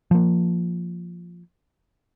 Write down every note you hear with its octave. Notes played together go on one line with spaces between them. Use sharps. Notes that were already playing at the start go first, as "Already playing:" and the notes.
F3 A#3